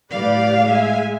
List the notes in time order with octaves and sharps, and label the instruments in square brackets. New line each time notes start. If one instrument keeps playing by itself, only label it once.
[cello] A2 F5 [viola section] G4 B4 D5
[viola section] G#3 E5 G#5